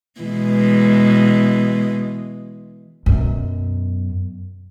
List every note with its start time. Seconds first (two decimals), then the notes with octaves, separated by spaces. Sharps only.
0.20 B2 E3 G#3
3.06 F#2 B2